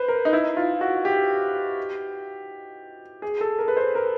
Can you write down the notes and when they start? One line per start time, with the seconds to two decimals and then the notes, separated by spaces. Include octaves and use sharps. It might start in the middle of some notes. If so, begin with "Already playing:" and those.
Already playing: B4 C5
0.08 A#4
0.25 D#4
0.33 E4
0.57 F4
0.81 F#4
1.05 G4
3.22 G#4
3.41 A4
3.59 A#4
3.68 B4
3.77 C5
3.95 A#4